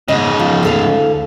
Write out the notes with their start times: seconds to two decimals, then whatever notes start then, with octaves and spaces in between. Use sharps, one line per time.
0.08 G#2 C#3 D#5
0.39 F3
0.63 D2 A4 F5